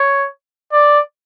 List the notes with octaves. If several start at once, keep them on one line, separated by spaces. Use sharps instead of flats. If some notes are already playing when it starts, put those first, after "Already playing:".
Already playing: C#5
D5